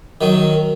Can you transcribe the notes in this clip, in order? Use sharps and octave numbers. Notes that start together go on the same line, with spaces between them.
D#3 F#3